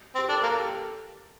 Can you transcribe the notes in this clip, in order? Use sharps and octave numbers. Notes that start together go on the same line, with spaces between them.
C4
G4
D4 A4
A#4
A#3
A4
G4